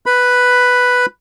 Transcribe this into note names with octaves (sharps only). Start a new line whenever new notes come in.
B4 B5